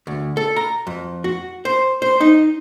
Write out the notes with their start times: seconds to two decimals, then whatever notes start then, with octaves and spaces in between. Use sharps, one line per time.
0.07 D2
0.37 A4
0.56 A#5
0.87 F2
1.24 F#4
1.65 C5
2.02 C5
2.21 D#4